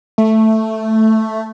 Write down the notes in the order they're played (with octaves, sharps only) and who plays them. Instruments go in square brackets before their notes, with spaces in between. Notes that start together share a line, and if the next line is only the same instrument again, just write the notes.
[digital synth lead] A3